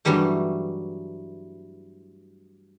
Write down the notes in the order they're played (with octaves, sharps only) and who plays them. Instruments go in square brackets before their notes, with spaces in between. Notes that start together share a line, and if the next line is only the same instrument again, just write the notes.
[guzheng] G2 E3 F#3 G3 A3